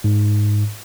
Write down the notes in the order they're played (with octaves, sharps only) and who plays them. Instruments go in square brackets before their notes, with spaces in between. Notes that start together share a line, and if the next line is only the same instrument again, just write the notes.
[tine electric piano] G#2